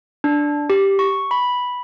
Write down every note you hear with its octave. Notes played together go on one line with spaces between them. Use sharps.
D4
G4
C#6
B5